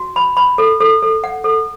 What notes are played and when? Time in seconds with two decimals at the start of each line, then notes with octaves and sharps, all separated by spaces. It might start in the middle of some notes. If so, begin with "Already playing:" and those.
Already playing: F#4
0.16 B5
0.37 B5
0.58 A4
0.80 A4
1.02 A4
1.24 F#5
1.44 A4